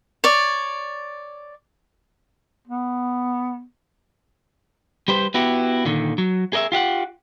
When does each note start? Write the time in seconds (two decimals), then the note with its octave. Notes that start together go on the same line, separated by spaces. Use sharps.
0.24 C#5 D5
2.68 B3
5.08 G3 G4 B4 C5
5.34 B3 E4 F#4 G4
5.85 A#2 D3 D#3
6.18 F#3
6.53 G#4 A#4 D#5 E5
6.72 F4 G4 F5 F#5